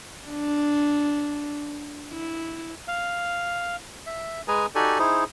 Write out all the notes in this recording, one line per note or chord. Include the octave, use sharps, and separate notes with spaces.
D4
E4
F5
E5
G#3 G#4 B4 G#5 A#5
D#4 F#4 G4 A4 D5 G#5
D#4 E4 G#4 C5